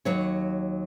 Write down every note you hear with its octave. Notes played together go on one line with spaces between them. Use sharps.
D#2 F#3 C#5